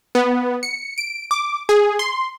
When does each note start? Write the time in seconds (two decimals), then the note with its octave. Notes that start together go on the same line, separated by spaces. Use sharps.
0.15 B3
0.63 C#7
0.98 D7
1.31 D6
1.69 G#4
1.99 C6